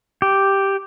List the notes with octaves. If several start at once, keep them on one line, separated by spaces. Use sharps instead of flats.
G4